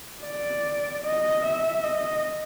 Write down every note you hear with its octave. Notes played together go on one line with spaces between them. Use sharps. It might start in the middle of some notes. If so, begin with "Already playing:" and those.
D5
D#5
E5
D#5